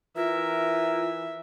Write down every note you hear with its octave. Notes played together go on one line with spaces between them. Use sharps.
E3 F4 A#4 E5